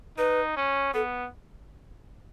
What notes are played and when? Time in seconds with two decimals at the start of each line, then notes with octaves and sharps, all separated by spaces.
0.18 D#4 B4
0.56 C#4
0.93 B3 A4